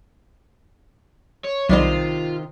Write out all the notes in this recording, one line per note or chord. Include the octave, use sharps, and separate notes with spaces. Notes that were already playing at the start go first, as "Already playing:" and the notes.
C#5
B1 C3 D#3 G3 F4 C5